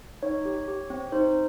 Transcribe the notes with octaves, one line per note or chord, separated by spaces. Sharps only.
D#4 C#5
G4
G4
C4
D#4 C5